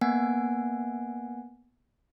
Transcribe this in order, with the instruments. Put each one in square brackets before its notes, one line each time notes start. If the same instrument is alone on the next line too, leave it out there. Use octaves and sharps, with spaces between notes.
[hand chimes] A#3 B3 F#5 G#5